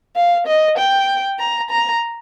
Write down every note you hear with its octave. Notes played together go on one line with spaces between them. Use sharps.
F5
D#5
G5
A#5
A#5